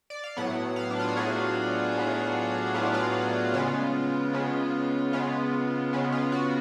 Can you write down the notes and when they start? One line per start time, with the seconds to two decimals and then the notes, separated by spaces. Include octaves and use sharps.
0.10 D5
0.24 F5
0.37 A2 F#3 B3 F#5
0.76 F5
0.91 D4
0.99 F4
1.07 F#4
1.16 A2 F#3 B3 G#4
1.95 A2 F#3 B3
2.74 A2 F#3 B3 F4
2.85 D4
2.94 F4
3.54 C#3 G#3 B3 F4
4.33 C#3 G#3 B3
5.13 C#3 G#3 B3 F4
5.93 C#3 G#3 B3
6.12 F4
6.32 F#4